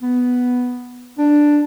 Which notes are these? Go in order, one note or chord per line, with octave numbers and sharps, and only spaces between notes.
B3
D4